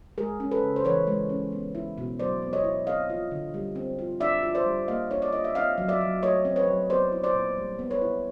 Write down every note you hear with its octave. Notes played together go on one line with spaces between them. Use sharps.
G#3 G#4 A#4
C#4
A4 B4
C#3
C5
E3 B4 C#5
G#3
C#4
B3
E4
B2
F#3 C5 D5
B3
C#5 D#5
E4
C4 D#5 F5
F4
D3
G3
C4
F4
D4 D5 E5
F4
C5 D5
G3
A#3 D#5 F5
D4 C#5
D5
F4 D#5
E5
C4 D#5 F5
F#3
D5 E5
F#3
A3 C#5 D#5
C4
B4 C#5
F#3
B3 C5 D5
E4
C5 D5
A#2
G3
B3
B4 C#5
E4